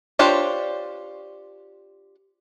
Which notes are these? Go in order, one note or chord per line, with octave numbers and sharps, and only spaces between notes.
D4 F4 G4 C5 C#5